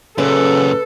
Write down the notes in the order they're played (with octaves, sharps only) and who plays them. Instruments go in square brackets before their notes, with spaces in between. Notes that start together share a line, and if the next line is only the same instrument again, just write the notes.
[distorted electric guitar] F#2 A#2 [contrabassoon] C#3 [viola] A4 [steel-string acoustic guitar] B4